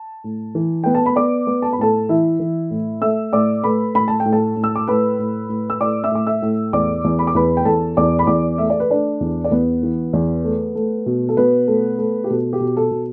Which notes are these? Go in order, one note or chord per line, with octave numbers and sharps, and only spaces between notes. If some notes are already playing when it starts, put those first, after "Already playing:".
Already playing: A5
A2
E3
B3 G5
A5
B5
B3 D5 D6
B3
A5
B5
A2 A4 A5
E3 E4 E5
E3
A2
A3 E5 E6
A2 D5 D6
A3 B4 B5
A2 B5
A5
G5
A2
A4 A5
A2
E6
D6
A2 B4 B5
A2
A2
E6
A2 D5 D6
E5 E6
A2 D6
E5 E6
A2
E2 D5 D6
E2
B5
D6
E2 B4 B5
G5
E2 A4 A5
E2 D5 D6
B5
E2 D5 D6
A3 E5
D5
B4
A3 D4 D5
E2
D5
E2 B3 B4
E3
E2
A3
A3
B2
A4
B2 B3 B4
A3
A3
G4
B2 A4
G4
B2
A4
B2